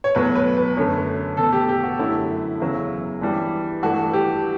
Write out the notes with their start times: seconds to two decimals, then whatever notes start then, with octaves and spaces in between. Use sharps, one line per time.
0.04 C#5
0.15 E2 B2 F#3 A3 B4
0.35 B4
0.57 B4
0.77 F#2 D3 A3 C#5
1.37 B2 A3 A4
1.53 G4
1.69 G4
1.83 F#4
1.99 F#2 D3 F#3 A3 E4
2.60 E2 C#3 F#3
3.21 G2 E3 G3
3.82 G2 E3 A3 F#4
4.13 G4